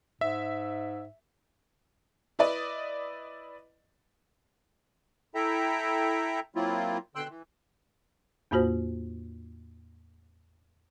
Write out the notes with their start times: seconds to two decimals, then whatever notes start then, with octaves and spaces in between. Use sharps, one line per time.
0.21 G#2 E5
2.39 E4 B4 D5 D#5
5.35 E4 A4 E5 G5 A#5
6.56 F#3 A#3 C4 E4 F4
7.15 B2 D3 G5 C6 E6 F#6
7.29 E3
8.51 E2 A2 A#3 F4 F#4 C5